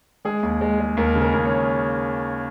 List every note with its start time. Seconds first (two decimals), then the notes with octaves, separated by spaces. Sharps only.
0.25 G#3 G#4
0.43 D#2
0.61 G#3
0.80 G#3
0.97 D#2 A#4
1.15 C#3
1.22 A#4
1.34 D#2
1.45 C#5